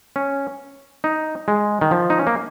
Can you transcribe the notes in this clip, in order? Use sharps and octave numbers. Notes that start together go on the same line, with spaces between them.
C#4
D#4
G#3
D#3
F3
D#4
C#4
A#3